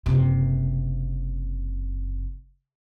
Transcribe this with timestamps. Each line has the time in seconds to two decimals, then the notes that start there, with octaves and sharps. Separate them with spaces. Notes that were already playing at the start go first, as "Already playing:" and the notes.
0.06 F#1 C3